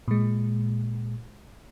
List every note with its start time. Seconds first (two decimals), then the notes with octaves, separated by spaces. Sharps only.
0.08 A#2 G#3